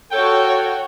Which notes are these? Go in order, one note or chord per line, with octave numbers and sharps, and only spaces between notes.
F#4 A4 C#5 G5